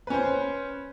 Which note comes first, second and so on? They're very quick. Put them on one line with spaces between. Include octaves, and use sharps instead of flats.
B4 C#4 C5